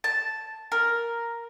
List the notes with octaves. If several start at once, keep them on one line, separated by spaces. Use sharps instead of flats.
A5
A#4